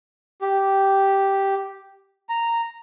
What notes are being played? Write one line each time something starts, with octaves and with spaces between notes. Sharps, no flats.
G4
A#5